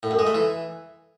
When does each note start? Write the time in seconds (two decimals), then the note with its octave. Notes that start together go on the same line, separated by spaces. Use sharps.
0.03 A2
0.11 F#2
0.19 G#3
0.27 A3
0.34 E3